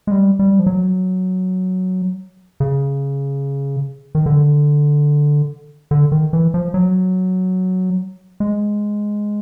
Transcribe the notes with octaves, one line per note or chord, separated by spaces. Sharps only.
G#3
G3
G3
F3
F#3
C#3
D#3
D3
D3
D#3
E3
F3
F#3
G#3